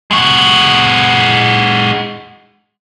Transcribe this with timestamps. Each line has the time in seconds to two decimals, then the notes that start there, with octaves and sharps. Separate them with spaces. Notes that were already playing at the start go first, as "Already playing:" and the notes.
0.11 G#3 F#4